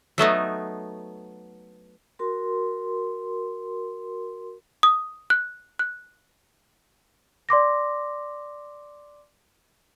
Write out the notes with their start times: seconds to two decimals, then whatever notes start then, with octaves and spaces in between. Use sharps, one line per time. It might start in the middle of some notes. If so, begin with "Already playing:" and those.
0.18 F#3 A3 B3 D#4
2.19 F#4 A#4 C6
4.83 D#6
5.30 F#6
5.79 F#6
7.49 D5 C6 D6 A#6